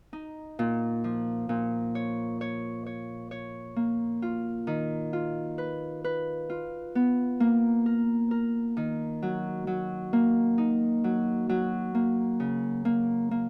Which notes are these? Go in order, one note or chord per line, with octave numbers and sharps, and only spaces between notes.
D#4
A#2
F3
A#2
C#5
C#5
C#5
C#5
A#3
F4
D#3
F4
B4
B4
F4
B3
A#3
A#4
A#4
D#3
F#3
F#3
A#3
D#4
F#3
F#3
A#3
C#3
A#3
A#3